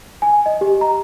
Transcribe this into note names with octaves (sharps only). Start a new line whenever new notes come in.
G#5
D#5
G4
A#5